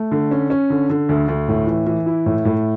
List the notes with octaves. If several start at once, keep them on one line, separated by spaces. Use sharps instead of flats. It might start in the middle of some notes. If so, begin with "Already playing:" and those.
Already playing: A3
D3
C#4
C#4
D3
D3
D2
D2
A2
E3
E3
E4
A2
A2